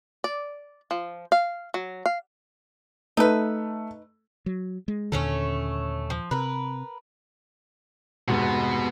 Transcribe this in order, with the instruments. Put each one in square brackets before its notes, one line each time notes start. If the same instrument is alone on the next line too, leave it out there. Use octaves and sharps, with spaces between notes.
[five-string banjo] D5
F3
F5
F#3
F5
[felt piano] A3 [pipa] D#4 B4
[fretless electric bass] F#3
G#3
[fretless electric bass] D#2 A#2 D3 [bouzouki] A3 C#4 C#5
[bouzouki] F3
[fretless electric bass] C3 [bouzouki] A#4 B4
[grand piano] F1 G#2 F#4 [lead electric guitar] B2 B3